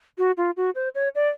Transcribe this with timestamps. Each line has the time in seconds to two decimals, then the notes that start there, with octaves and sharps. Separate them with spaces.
0.18 F#4
0.37 F4
0.57 F#4
0.75 C5
0.95 C#5
1.15 D5